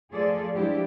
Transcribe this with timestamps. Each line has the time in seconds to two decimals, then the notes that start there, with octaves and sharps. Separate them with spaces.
0.11 F3 A3 F4 G#4 A4 D5
0.55 F3 G3 G#3 D4 E4 G4